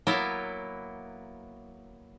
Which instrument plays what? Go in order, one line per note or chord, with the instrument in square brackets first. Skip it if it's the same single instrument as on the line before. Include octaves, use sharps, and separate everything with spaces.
[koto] F#3 A#3 B3 E4